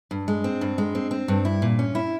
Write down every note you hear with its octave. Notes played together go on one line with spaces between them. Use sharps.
G2
G#3
C4
G2
G#3
C4
C4
G2
E4
A#2
C#4
E4